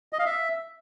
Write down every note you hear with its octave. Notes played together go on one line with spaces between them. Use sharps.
D#5
F5
E5